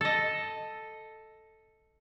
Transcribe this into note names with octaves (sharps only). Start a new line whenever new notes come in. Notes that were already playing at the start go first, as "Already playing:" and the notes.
A4 D#5